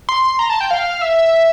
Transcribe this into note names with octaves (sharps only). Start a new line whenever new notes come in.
C6
A#5
A5
G5
F5
E5